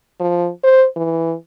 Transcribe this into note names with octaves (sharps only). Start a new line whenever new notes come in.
F3
C5
E3